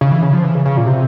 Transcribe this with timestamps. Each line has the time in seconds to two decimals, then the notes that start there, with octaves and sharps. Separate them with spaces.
0.01 C#3
0.11 E3
0.23 C#3
0.33 F3
0.44 E3
0.55 C#3
0.66 C#3
0.77 A#2
0.87 C3